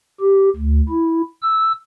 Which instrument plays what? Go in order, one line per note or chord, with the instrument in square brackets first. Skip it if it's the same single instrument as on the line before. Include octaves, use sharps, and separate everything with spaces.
[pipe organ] G4
D2
E4
E6